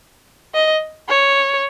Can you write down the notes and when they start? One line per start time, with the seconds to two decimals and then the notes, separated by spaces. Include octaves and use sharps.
0.55 D#5
1.09 C#5